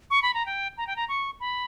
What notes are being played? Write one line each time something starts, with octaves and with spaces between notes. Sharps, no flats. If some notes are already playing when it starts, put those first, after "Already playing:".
C#6
B5
A#5
G5
A#5
G5
A#5
C#6
B5